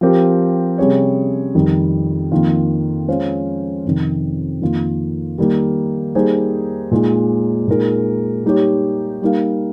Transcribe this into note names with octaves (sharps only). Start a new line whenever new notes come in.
F3 C4 G4 A#4
C3 G3 C#4 G#4 C#5
F2 D#3 G3
F2 D#3 A#3 F4
G#3 C#4 F4 C5 F5
F2 C3 D#3
F2 D#3 A#3 F4
D#3 G3 A#3 D#4 A#4
G3 A#3 D#4 G#4 C5
A#2 G#3 D#4
A#2 G#3 D#4 A#4
G3 A#3 D#4 G4 C#5
G3 A#3 D#4 A#4 F5